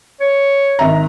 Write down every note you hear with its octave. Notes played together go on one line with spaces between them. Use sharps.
C#5
G#1 E5 A#5